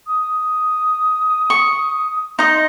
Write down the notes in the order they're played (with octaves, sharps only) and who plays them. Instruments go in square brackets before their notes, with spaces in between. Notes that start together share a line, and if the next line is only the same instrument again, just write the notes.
[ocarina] D#6
[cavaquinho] C#6
[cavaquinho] D#4 D#5 [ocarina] C6